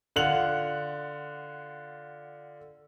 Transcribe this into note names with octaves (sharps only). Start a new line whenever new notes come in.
D3 F4 F#5 F7 F#7